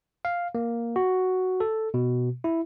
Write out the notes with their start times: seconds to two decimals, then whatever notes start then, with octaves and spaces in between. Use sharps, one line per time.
0.25 F5
0.55 A#3
0.96 F#4
1.60 A4
1.94 B2
2.44 E4